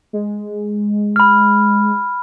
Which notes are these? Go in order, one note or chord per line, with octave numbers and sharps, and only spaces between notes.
G#3
B5 F6